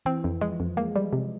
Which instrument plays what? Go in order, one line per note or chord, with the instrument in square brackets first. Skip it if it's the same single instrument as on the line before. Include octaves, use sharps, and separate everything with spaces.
[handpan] E3 [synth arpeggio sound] C4
[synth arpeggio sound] F2
[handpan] F3 [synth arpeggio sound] G#3
[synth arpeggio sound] F2
[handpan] G#3 [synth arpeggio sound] A#3
[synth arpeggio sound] G3
C3